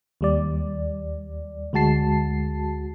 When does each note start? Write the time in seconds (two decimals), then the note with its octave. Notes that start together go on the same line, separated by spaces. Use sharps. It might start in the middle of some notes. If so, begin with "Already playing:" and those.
0.21 D#2 G3 D5
1.73 D2 G#3 F#4 A5 C7